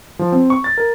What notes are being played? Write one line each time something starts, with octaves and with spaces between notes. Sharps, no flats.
F3
C4
C#6
A6
A#4